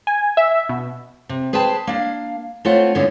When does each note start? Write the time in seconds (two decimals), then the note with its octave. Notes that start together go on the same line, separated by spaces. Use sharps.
0.07 G#5
0.37 E5
0.69 B2
1.29 C3
1.53 G#4 B4 C5 G5 A5
1.87 A#3 D4 F5
2.65 A3 C4 F4 C#5 F#5
2.95 G#2 D3 B3 C#4 E4